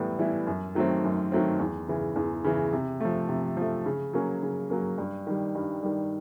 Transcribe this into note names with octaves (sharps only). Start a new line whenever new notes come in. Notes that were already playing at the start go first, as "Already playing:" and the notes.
Already playing: A2 E3 G3 B3 E4
E3 G3 B3 E4
F#2
D#3 F#3 A3 C4
F#2
D#3 F#3 A3 C4
E2
C#3 E3
E2
C#3 E3
C3
F3 A3
C3
F3 A3
C#3
F#3 A#3 C#4
C#3
F#3 A#3 C#4
G2
D#3 G3
G2
D#3 G3